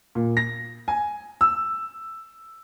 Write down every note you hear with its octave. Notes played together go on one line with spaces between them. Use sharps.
A#2
A#6
G#5
E6